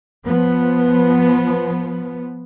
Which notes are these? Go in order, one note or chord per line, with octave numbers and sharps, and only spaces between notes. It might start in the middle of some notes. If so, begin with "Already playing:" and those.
F3 B3